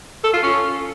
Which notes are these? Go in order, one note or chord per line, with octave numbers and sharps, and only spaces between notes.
A4
F4
C#4